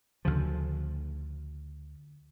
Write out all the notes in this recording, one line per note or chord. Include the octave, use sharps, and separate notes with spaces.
D2 C#3 F3